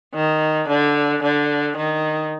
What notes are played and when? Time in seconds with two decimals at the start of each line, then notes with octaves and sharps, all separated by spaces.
0.15 D#3
0.69 D3
1.23 D3
1.77 D#3